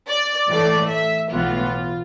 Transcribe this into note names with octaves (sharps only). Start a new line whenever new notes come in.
D5
A2 E3 A3 D5
E5
B1 A2 E3 B3 F4